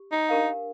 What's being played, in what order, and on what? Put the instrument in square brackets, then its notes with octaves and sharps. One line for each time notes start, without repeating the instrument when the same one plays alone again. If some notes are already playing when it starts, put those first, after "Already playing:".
Already playing: [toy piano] G4
[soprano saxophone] D#4
[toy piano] D4 G4 A#4 F5